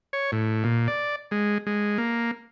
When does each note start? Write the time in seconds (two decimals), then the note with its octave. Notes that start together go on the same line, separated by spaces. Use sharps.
0.13 C#5
0.32 A2
0.64 A#2
0.88 D5
1.31 G#3
1.67 G#3
1.98 A#3